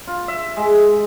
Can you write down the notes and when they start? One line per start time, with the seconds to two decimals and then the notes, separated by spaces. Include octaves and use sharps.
0.07 F4
0.28 E5
0.57 G#3